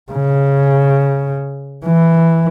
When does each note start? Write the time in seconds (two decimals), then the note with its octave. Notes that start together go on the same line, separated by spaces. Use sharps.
0.12 C#3
1.85 E3